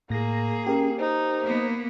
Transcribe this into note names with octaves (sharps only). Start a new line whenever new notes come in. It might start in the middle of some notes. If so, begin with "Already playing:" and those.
A2 A#3 G#4 A#6
C#4 G4 A#4
D#4 C5
A#3 B3